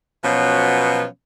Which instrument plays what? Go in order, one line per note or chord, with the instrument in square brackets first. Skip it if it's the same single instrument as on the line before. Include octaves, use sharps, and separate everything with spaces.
[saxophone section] B2 F3 F#3 B3 C#4